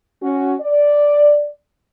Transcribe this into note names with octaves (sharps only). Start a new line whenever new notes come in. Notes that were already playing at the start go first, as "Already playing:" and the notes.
C#4 F#4
D5